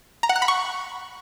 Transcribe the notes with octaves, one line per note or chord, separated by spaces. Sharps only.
A#5
F#5
F#6
B5
C#6